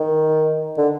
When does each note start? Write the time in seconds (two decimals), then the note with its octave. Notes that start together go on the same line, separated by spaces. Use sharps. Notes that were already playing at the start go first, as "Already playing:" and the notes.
Already playing: D#3
0.78 D3